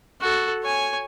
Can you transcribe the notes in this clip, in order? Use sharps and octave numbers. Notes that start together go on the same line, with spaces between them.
F#4 A4
C#5 G#5